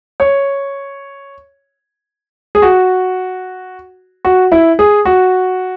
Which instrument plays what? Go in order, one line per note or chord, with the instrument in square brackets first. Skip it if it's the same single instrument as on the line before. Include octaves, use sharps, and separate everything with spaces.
[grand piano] C#5
G#4
F#4
F#4
E4
G#4
F#4